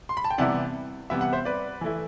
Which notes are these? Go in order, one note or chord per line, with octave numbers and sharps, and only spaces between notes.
C6
B5
A5
G5
C3 E3 G3 B3 E4 D5 F#5
C3 E3 G3 B3 E4 E5
F#5
C5 E5
B4 D5
E3 A3 E4